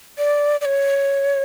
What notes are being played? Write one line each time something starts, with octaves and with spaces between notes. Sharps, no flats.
D5
D5
C#5